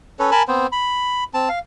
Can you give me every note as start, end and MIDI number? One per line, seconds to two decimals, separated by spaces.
0.19 0.30 61
0.19 0.30 69
0.19 0.30 71
0.19 0.30 73
0.31 0.43 70
0.31 0.43 80
0.31 0.43 81
0.31 0.43 83
0.48 0.67 59
0.48 0.67 60
0.48 0.67 72
0.72 1.24 83
1.34 1.49 60
1.34 1.49 81
1.49 1.59 77